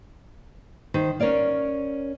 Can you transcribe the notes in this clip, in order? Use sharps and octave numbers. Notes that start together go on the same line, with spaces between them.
D#3 C5
C#4 A#4 C#5 D5 F5